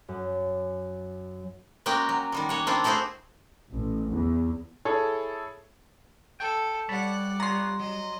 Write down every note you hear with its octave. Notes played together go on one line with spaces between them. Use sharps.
F#2
G#3 A#3 C#4 F#4 A#4 G5
F#3
D#3 G3 G#3
A#3 C#5 F#5
A#3 C4 D4 E4 F4
A3 E4 F#4 G#4 C5
A1
E2
E4 G#4 A4 C#5
A4 G5
G3 C#5 D5 F#5 A5 B5
B3 F4 C#5 A#5 C6
F#3 D#5